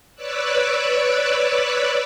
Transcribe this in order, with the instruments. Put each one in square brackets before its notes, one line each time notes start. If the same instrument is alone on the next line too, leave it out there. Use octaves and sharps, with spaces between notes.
[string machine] B4 C#5 D5 D6 E6 F#6